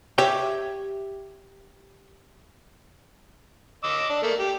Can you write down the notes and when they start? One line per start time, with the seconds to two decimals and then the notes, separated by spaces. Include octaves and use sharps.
0.18 G4 C#5 E5 G5
3.84 D#5 D6 E6
4.10 D4
4.23 A3 A#3
4.39 G4